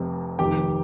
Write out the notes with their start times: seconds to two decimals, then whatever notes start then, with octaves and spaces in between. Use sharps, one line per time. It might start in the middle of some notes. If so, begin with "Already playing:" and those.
Already playing: F1 F2 C3
0.39 F1 F2 D#3 G4 G5